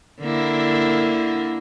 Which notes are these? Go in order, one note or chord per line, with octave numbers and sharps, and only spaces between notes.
D3 A#3 E4